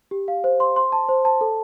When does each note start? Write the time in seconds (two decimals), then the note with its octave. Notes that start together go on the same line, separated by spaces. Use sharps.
0.11 G4
0.28 F5
0.44 C5
0.60 C6
0.76 C6
0.92 A5
1.09 C5
1.25 A5
1.41 A4